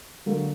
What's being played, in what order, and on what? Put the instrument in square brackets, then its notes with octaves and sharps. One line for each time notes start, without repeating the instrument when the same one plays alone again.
[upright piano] D3 F#3 A#3